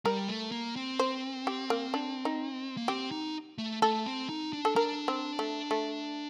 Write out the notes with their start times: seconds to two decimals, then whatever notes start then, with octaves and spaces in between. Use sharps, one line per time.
0.05 G3 A#4
0.28 A3
0.52 A#3
0.76 C4
0.99 C5
1.47 G4
1.70 A#3
1.94 D4
2.25 D#4
2.77 A#3
2.88 C4 G4
3.11 D#4
3.58 A3
3.82 A3 A4
4.06 C4
4.29 D#4
4.53 D4
4.65 A4
4.76 D4 A#4
5.08 C4
5.39 A3
5.71 A3